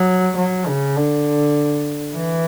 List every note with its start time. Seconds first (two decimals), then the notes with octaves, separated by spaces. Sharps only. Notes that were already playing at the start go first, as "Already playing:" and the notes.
Already playing: F#3
0.37 F#3
0.67 C#3
0.96 D3
2.15 E3